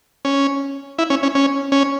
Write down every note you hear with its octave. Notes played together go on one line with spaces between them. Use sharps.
C#4
E4
C#4
C#4
C#4
C#4